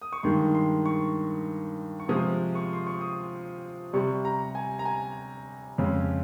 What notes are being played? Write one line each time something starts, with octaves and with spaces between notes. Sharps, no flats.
D#6
C#6
G2 D#3 G#3 C6
C6
C#6
C#6
C3 F3 G#3 D#6
C#6
C6
C#6
D#6
C3 G3 C#6
A#5
G#5
A#5
G#5
F2 C#3 G#3